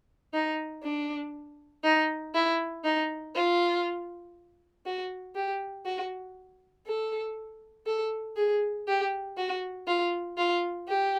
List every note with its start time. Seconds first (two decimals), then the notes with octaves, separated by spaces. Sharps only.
0.34 D#4
0.83 D4
1.84 D#4
2.34 E4
2.84 D#4
3.35 F4
4.86 F#4
5.35 G4
5.85 F#4
6.87 A4
7.86 A4
8.36 G#4
8.87 G4
9.37 F#4
9.88 F4
10.38 F4
10.88 G4